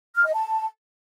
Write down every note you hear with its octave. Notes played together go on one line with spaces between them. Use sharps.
F6
D#5
A5